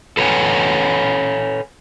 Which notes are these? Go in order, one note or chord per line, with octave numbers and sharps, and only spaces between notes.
A4 B4 C#5 E5 F#5 G#5